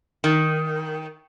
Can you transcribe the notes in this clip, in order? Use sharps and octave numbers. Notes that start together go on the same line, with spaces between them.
D#3